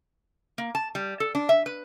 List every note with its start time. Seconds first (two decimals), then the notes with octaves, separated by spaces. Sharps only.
0.58 A#3
0.75 A5
0.95 G3
1.20 A4
1.35 D4
1.49 E5
1.66 B4